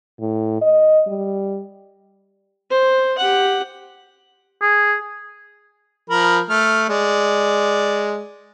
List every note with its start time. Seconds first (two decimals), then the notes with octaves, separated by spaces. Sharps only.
0.20 A2
0.61 D#5
1.07 G3
2.70 C5
3.18 G4 F#5
4.62 G#4
6.10 F3 A#4 B5
6.50 A3 F6
6.89 G#3 D5